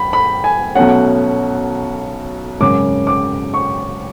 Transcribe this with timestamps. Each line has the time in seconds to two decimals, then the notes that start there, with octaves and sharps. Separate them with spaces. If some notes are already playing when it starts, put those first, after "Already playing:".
Already playing: F#2 B5
0.13 B5
0.44 G#5
0.75 B1 B2 A3 C#4 F#5
2.61 G#1 F#2 C#3 F#3 D6
3.07 D6
3.54 C#6